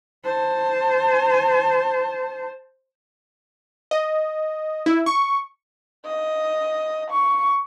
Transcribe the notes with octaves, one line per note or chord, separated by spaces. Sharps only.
C5 A5
D#5
E4
C#6
D#5
C#6